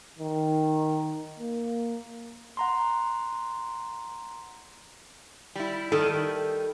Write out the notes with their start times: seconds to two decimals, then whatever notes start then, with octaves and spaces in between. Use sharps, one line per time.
0.19 D#3
1.40 A#3
2.57 F#5 A#5 C6
5.55 G3 E4
5.92 D#3 G3 A4